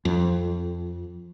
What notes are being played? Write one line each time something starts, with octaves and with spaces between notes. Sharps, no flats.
F2